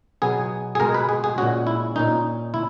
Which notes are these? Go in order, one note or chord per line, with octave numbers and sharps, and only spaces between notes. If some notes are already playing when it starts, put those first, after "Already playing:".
B2 F#3 B3 G#4
G#4
B2 G#3 B3 A#4
B4
G#4
G#4
A#2 G#3 C#4 F#4
E4
A#2 A#3 C#4 D#4
E4